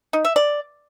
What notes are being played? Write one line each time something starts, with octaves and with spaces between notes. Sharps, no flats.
D#4
E5
D5